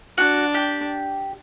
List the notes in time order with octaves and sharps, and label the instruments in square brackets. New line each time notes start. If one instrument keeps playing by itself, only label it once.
[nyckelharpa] D4 [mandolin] F#4
[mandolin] G4